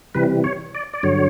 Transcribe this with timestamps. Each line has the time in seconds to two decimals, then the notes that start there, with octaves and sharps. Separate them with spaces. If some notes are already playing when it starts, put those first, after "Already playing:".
0.15 C3 E3 G3 B4
0.44 C#5
0.75 D5
0.94 D5
1.03 G2 D3 F#3 C#5